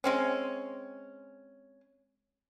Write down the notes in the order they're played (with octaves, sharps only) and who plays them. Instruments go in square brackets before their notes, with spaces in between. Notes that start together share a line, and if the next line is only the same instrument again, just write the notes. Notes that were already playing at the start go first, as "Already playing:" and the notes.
[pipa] G#3 C4 C#4